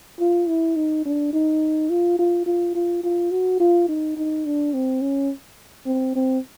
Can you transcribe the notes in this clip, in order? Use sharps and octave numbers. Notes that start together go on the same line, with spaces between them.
F4
E4
D#4
D4
D#4
F4
F4
F4
F4
F4
F#4
F4
D#4
D#4
D4
C4
C#4
C4
C4